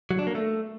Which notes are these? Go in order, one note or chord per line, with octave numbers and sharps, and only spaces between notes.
F#3
D4
A#3
A3